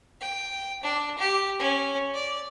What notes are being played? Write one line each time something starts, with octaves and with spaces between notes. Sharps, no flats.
G5
D4
G4
C#4
D5